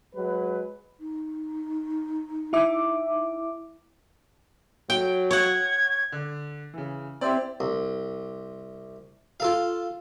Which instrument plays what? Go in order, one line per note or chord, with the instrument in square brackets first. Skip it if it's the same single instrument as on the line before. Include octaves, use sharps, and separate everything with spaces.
[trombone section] F#3 G#3 B4
[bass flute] D#4
[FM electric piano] E4 E5 D6
[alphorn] F#3 [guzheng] G5
[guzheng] C#5 F#5 [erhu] G#6
[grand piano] D3
C#3 E3
[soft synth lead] C4 [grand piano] E4 G4 D5
[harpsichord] C2
F4 A4 F5